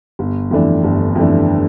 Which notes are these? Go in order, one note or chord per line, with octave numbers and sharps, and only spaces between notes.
G1
F2 E3 A3 D4
G1
F2 E3 A3 D4